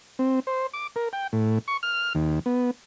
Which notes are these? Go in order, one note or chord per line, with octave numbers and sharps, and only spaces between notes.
C4
C5
D6
A#4
G5
A2
C#6
F6
D#2
B3